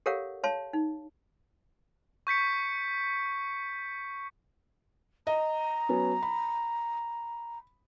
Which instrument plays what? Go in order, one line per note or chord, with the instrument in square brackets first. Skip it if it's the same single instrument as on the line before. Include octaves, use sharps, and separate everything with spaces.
[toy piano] G4 A4 A#4 C#5 F5 F#5
C#5 F5 A5 C6
D#4
[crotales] C#6 G6 B6 C#7
[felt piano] D#5 [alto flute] A#5
[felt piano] F#3 B3 C#4
B5